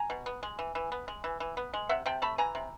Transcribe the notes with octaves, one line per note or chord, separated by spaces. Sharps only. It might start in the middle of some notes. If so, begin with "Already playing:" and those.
Already playing: G#5 A#5
B2
B3
G#3
E3
E3
B3
G#3
E3
E3
B3
G#3
C3 E5 F#5
C3 G5 A5
A3 A5 B5
E3 G#5 A#5
C3